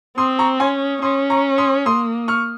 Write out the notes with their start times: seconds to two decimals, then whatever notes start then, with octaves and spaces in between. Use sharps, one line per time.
0.17 C4 C6 D#6
0.39 A#5 C#6
0.60 C#4 G#5 C6
1.02 C#4 C6 D#6
1.30 A#5 C#6
1.58 C6 D#6
1.86 A#3 C6 D#6
2.28 C#6 F6